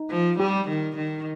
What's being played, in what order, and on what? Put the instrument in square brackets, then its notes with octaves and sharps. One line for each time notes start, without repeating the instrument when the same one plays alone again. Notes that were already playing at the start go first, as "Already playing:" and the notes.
Already playing: [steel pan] D#4
[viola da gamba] F3
[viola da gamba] G3 [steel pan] G4
[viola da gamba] D#3
D#3